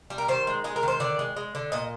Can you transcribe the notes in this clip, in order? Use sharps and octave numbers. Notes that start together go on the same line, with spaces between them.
G3
A#4
D#3 C5
G#3
G#3 G#4
A#4
D#3 C5
D3 D5
G#3
G#3
D3
A#2 D#5